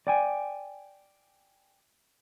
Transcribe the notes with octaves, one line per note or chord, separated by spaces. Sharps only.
D5 G5 G#5